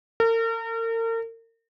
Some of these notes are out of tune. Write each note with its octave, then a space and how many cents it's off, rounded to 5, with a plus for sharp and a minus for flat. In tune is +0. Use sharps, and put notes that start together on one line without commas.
A#4 -40